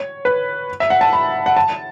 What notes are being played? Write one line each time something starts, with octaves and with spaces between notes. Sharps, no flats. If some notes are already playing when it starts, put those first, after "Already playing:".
Already playing: C#5
B4
E5
F#5
A5
B5
F#5
A5